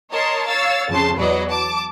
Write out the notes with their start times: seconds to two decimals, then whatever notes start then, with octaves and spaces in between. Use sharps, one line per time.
0.12 A#4 C#5 D#5 A5 C6
0.47 C#5 F5 E6 A6
0.89 F2 C#3 A5 C6
1.18 E2 F#3 B4 D5 D#5
1.48 A5 D6